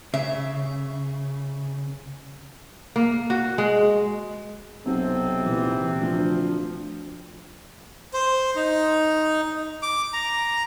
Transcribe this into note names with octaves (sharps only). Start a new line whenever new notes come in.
C#3 E5
A#3
F#4
G#3
B1 C3 C4
A#2 E3
D2 F3
C5
D#4
D6
A#5